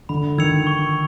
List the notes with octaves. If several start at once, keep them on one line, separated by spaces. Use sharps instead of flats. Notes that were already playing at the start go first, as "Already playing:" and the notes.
D3 B5
D#3 E6 G#6 C#7 F7
C#6